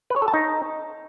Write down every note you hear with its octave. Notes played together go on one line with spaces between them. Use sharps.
B4
C#5
A4
A5
D#4